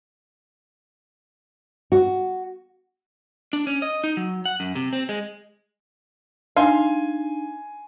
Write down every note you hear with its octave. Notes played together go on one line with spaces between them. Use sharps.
F#4
D4
C#4
D#5
D#4
F#3
F#5
F#2
C3
C4
G#3
D4 D#4 F5 G#5 C6